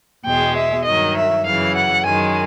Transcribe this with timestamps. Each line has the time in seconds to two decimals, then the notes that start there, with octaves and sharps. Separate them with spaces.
0.25 E2 B2 G#3 G5
0.55 E5
0.85 G2 D#3 F#3 D#5
1.16 E5
1.45 F#2 C#3 E3 F5
1.75 F#5
2.05 F#2 D#3 G#3 G#5